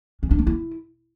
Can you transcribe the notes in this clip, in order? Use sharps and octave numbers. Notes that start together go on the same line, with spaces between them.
C#4
D4
A#3
E4